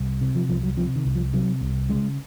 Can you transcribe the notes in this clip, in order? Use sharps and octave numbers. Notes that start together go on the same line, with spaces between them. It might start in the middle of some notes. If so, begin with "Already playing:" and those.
Already playing: C2
C3
F3
C2 F3
F#3
C3 F3
D#3
C2
F3
C3 F#3
C2
C#3 G#3